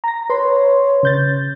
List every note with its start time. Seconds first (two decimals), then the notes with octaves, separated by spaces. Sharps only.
0.04 A#5 A#6
0.30 B4 C#5 C6
1.03 C#3 G6 A6